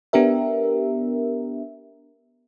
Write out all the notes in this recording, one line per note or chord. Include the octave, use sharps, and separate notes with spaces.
B3 D4 G4 A#4 E5